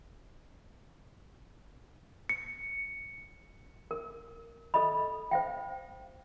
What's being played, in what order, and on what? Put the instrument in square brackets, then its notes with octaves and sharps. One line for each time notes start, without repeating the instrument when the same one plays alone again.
[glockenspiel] C#7
[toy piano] A#4
A4 D#5 B5
C5 F5 G5